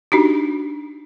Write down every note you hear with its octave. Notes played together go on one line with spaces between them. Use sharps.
D4 D#4 F#4 G4